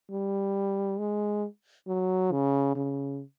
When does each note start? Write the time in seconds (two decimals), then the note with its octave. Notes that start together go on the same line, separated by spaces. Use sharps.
0.11 G3
0.99 G#3
1.87 F#3
2.32 C#3
2.75 C#3